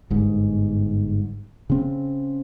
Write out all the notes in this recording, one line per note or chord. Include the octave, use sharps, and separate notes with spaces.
G1 G#2
C#3 C4